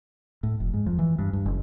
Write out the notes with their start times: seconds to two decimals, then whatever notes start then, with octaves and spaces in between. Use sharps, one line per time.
0.43 A2
0.60 F1
0.74 G#2
0.86 F2
0.99 E3
1.19 G2
1.33 G2
1.46 F#1